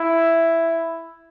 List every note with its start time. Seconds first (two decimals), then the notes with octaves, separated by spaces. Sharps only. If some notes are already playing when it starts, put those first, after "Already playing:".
Already playing: E4